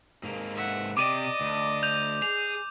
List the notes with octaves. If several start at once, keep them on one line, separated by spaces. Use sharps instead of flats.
G#2 A#3
E5 F#5
C3 D5 D#5 D6 D#7
D2
G6 F7
G#4 F7